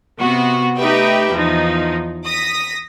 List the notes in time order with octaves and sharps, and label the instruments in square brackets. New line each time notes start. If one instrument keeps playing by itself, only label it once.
[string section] C3 B3 F#4
A3 D#4 G4 B4 E5 G5
E2 F3 D#4
D#6 A#6 B6